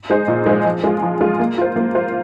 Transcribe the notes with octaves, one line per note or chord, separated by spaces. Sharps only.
G#3 D#4 G#4 C5
A#2
G#3 D#4 G#4 C5
F3
G#3 F4
F3
G#3 F4
A#3
F4 C5
A#3
F4 C5